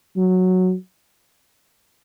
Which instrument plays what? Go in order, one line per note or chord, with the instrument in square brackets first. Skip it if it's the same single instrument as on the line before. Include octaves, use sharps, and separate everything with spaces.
[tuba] F#3